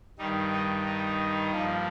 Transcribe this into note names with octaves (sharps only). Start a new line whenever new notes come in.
G2 D#3 G3 D#4
D#4
D#4
G2 F3 A#3